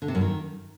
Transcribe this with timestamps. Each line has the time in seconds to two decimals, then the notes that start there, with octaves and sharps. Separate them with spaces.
0.02 D3
0.08 C3
0.15 F#2
0.21 D#3